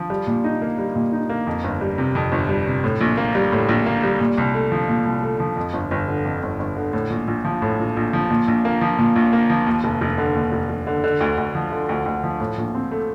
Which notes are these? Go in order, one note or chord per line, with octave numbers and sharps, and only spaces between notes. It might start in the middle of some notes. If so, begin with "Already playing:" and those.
Already playing: F3
G3
A#2
D#4
A#3
G3
A#2
D#4
A#3
F2
G1
G3
C3
F2
G1
G3
C3
A2
A#1
A#3
G3
A2
A#1
A#3
G3
A#2
C2
A3
F3
A#2
C2
A3
F3
F2
G1
G1
D3
F2
G1
G1
D3
A2
A#1
A#1
F3
A2
A#1
A#1
F3
A#2
A#1
A#3
F3
A#2
A#1
A#3
F3
D#2
F1
F1
D3
D#2
F1
F1
D3
D3
D2
D2
F3
D3
D2
D2
F3
A2
A#1
C4
A3